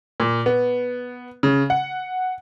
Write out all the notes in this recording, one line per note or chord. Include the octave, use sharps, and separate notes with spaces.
A#2
B3
C#3
F#5